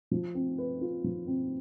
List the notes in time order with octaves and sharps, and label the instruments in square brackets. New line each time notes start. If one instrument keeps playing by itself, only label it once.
[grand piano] F3
C4
B4
F4
F3
C4